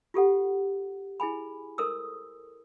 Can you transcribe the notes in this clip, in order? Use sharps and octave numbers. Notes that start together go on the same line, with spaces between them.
F4 G4 A4 F#5
E4 G#4 G#5 B5
A4 A#4 C5 D#6 E6